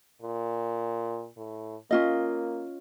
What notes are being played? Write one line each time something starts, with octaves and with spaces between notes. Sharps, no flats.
A#2
A2
A#3 C#4 F4 D#5